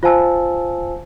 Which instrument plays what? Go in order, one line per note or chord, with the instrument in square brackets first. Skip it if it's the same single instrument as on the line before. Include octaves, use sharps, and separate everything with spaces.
[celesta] F4 C5 F5 G#5 A5 E6